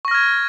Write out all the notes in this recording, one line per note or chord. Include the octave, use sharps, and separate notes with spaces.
C#6 F6 G#6 A#6